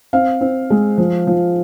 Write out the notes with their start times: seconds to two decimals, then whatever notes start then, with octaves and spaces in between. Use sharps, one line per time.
0.13 C4 F5
0.41 C4
0.70 G#3
0.98 F3
1.27 F3